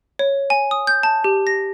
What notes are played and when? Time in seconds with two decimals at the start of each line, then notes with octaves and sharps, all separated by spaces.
0.19 C#5
0.50 G#5
0.71 D#6
0.87 G6
1.03 A5
1.24 G4
1.47 A#6